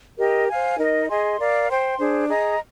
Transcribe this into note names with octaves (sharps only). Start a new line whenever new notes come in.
G4 A#4 D#5
C5 F5 G#5
D#4 A#4 D#5
G#4 D#5 G#5 C6
A#4 D5 F5
C5 G5 C6
D4 G#4 C5
G#4 D#5 A#5